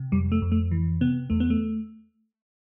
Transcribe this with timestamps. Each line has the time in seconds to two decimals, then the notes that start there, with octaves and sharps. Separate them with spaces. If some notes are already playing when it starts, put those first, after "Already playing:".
Already playing: C3
0.12 F2 G3
0.32 A3
0.42 F2
0.52 A3
0.71 E3
1.01 C3 B3
1.30 E2 A3
1.40 B3
1.50 A3